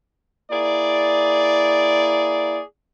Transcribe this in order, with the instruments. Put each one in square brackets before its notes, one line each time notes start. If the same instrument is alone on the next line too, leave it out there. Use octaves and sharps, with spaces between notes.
[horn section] A#3 E4 G#4 D5